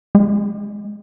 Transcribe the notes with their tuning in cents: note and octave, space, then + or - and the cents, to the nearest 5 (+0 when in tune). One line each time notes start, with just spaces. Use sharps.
G#3 +0